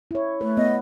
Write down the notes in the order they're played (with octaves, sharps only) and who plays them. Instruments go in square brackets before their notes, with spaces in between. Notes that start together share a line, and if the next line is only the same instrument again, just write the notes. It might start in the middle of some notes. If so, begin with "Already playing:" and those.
[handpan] E4 C#5
[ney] A3 [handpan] B4
[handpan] B3 [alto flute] D#5